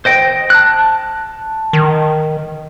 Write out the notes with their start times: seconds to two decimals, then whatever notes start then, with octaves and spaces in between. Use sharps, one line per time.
0.05 C5 D#5 G5
0.50 A5 F#6
1.73 D#3